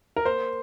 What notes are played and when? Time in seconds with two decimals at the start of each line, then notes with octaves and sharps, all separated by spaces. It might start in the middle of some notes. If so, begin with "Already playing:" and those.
0.17 A#4
0.25 A#3 C5